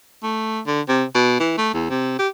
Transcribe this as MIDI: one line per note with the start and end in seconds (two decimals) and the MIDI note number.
0.23 0.60 57
0.67 0.81 50
0.88 1.04 48
1.14 1.40 47
1.40 1.54 52
1.58 1.70 57
1.74 1.85 40
1.90 2.15 48
2.19 2.28 67